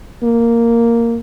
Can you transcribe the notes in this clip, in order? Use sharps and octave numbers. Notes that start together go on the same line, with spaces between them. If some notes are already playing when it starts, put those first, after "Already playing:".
A#3